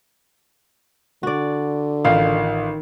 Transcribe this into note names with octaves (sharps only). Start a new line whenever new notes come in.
D3 F#4 D5
A1 D#3 F4 F5